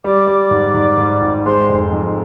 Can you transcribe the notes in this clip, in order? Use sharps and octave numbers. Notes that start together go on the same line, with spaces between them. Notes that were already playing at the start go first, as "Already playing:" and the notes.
G3 D5 D6
G3
G#2
G#2
G#2
G#1
G#3 C5 C6
F1
F2